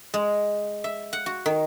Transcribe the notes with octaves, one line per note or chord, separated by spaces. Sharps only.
G#3
E5
F#5
F#4
D#3